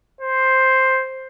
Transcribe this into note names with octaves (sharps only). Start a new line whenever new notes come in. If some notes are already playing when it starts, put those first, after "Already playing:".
C5